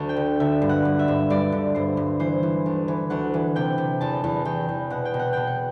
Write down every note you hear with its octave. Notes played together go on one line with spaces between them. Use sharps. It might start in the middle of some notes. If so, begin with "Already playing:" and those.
Already playing: D2 A5
G5
D3
D3 E5
G2
F#5
G2
E5
G2
G2 D5
D3
G2 C5
G2
E3 C5
E3
D2
E3
D2 F#5
E3
C3 G5
C3
E2 A5
E2
E2 G5
E2
B2 F#5
G5
B2
F#5
B2 G5
F#5